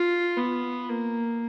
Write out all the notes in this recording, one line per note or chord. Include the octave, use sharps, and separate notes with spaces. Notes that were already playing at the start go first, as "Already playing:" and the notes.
Already playing: F4
B3
A#3